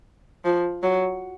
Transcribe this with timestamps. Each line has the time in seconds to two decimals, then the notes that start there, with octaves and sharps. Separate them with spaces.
0.45 F3
0.83 F#3